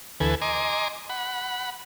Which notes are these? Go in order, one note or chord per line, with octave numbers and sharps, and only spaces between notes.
D2 E3 A4 B4 G#5
D#5 G#5 A#5 C6 D6
F#5 B5